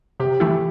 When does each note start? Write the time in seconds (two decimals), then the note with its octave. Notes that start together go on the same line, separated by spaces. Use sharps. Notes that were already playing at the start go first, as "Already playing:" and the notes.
0.20 C3 G4
0.40 E3 A3 E4